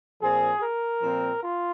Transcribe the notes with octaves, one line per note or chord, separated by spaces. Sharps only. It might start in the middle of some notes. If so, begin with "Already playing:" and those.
A#2 F3 C4 G#4
A#4
A#2 F3 C4
F4